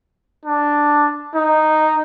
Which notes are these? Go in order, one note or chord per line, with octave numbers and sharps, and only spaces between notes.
D4
D#4